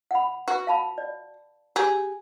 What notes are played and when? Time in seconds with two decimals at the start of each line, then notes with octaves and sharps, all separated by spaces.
0.11 F#5 B5
0.48 F#4 B4
0.67 F5 A5 B5
0.98 D5
1.76 G4 G#4